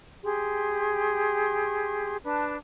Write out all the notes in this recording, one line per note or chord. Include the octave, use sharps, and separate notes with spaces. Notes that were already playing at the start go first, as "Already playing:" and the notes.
G4 G#4 C6
D4 B4 A5